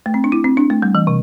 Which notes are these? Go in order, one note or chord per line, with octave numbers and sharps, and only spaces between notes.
A3
C4
D4
E4
C4
D4
A3
G3
E3
C3